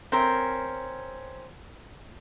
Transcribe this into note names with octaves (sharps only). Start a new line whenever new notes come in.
C4 C#4 A#4